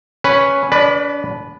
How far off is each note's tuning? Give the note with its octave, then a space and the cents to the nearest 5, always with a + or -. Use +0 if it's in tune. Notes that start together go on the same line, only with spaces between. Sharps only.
C#4 +0 B4 +0
D4 -35 B4 +0 D5 +30